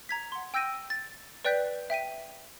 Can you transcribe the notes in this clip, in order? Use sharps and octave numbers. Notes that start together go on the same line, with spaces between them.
A#5 G#6 B6
F#5 C6
G5 E6 G6 A#6 D7 D#7
A6
B4 D5 G5 F#6 G6 B6
E5 G5 B6 D#7